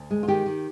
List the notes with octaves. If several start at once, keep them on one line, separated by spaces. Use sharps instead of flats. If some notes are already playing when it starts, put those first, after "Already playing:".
Already playing: D2
G#3
F4
D#3 G4
D#3